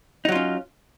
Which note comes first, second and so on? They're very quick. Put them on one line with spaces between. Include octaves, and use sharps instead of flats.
D#4 F#3 F4 C#4